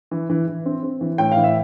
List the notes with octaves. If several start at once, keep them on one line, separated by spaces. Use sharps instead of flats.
E3
E3
E3
C4
C4
E3
A2 G5
E3 F5
E5